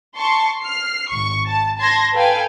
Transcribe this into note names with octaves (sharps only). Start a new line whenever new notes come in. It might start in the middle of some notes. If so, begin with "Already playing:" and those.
A5 C6 C#6
F6 C7
G#1 C#6
A5
A5 C6 G#6 A#6
A4 B4 F5 G5 G#5